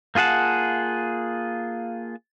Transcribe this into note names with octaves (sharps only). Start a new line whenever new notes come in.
A#3 F4 G#4 F#5 A5